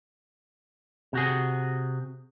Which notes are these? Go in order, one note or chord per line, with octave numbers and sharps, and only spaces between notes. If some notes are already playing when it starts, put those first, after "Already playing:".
C3 F#4 G#4